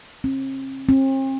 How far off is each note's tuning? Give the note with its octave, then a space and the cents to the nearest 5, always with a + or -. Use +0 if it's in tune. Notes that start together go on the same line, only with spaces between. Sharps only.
C4 +45
C4 +40